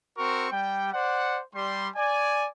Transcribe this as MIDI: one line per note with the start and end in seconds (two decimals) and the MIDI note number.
0.17 0.51 60
0.17 0.51 66
0.17 0.51 70
0.17 0.51 85
0.51 0.91 55
0.51 0.91 79
0.93 1.40 72
0.93 1.40 74
0.93 1.40 78
1.55 1.88 55
1.55 1.88 84
1.96 2.47 74
1.96 2.47 80